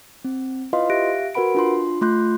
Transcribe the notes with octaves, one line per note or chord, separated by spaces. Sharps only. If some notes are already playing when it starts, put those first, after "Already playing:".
C4
E4 F4 B4 D#5 F5 C6
G4 E5 F5 F#6 A#6 D7
F#4 A#4 B4 F#5 B5 D7
D4 F4 C6
A3 F4 C6 F#6 G6